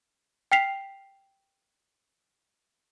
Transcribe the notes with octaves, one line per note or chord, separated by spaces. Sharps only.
G5 F6 B6 C7 F7